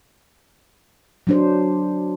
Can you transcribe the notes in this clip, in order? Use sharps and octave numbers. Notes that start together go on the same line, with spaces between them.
F#3 D4 C5